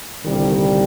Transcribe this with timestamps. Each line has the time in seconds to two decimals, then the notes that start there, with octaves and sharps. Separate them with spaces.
0.24 C2 A#2 D#3 G3
0.33 D3
0.42 D#3